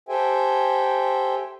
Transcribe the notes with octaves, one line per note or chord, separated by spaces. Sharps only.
G4 A4 C5 E5 G5 G#5